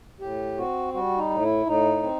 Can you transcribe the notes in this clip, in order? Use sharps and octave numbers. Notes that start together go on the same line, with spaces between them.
A2 G4
C4 F#4
G3 F#4
D#4
A2
E4
A2 D#4
C4